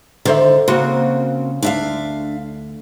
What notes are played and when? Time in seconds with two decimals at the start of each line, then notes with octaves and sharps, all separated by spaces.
0.25 D3 D#3 C5 E5
0.68 C#3 A#3 C4 F#4
1.62 D2 D4 E5 F5